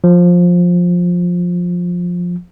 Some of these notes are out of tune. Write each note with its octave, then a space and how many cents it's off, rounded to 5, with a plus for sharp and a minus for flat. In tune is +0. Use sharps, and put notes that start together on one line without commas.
F3 +15